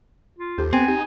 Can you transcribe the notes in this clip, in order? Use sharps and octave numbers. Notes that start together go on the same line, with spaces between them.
F4
D#2 G4 A4 C5
B3 C4 G#5
D#4 G4